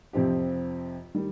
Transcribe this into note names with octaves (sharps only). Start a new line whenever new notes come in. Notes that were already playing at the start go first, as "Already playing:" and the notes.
F2 C3 F3 C4 G4
D#3 G3